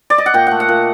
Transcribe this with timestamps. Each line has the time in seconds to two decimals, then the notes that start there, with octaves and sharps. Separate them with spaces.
0.10 D5
0.18 D#5
0.26 F#5
0.34 A#2 G5
0.47 A3 F#5
0.60 F#5
0.69 A#2